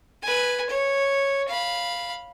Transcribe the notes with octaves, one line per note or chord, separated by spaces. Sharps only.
B4 G#5
C#5
F5 B5